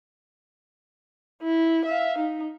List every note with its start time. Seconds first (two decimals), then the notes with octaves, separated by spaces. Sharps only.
1.42 E4
1.85 E5 F5
2.18 D#4